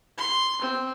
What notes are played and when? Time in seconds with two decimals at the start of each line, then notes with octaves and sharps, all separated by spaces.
0.18 C6
0.62 C4